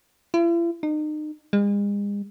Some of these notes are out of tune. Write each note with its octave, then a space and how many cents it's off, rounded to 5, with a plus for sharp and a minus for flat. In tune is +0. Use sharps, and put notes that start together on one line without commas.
E4 +45
D#4 -35
G#3 -40